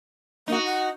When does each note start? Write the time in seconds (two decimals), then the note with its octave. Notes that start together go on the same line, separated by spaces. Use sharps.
0.48 A#3 D#4 F#4
0.65 F#5